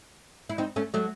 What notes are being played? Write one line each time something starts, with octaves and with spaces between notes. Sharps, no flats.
E4
C4 D#4
A3 C#4
F#3 A3